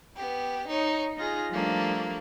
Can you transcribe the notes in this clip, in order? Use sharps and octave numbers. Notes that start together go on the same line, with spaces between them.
B3 G4
D#4 C#5
D#4 F4 G#4 A#6
F3 G3 A3 A#3 D4